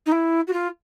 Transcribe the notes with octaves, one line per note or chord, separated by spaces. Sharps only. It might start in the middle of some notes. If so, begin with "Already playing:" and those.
D#4
E4
F#4
F4